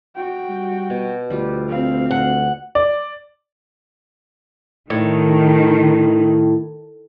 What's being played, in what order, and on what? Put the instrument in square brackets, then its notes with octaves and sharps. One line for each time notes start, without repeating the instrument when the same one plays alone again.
[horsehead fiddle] F#4 G5
[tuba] G3
[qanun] B2
[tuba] D2 [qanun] G3 F4 G4
[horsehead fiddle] C4 F5
[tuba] D2 [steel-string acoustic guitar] F#5
[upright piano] D5
[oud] A2 [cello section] D#3